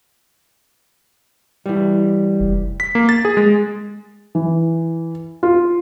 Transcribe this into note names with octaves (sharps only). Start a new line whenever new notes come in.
E3 G3
F1
B6
A#3
A6
G#4
G#3
E3
F4